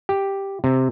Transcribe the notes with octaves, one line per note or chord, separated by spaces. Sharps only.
G4
C3